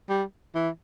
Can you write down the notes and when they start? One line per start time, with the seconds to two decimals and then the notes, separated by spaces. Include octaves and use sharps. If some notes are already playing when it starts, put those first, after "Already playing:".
0.09 G3
0.55 E3